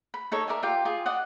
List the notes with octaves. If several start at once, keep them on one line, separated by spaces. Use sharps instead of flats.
B5
D#4 A4 C#5
A#4 D5 E5 G#5
F4 G4 A#4 G5
F4 G#4
D5 D#5 F#5